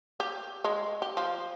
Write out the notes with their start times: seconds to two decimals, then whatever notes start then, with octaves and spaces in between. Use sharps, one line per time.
0.20 G4
0.64 G#3
1.02 G4
1.17 F3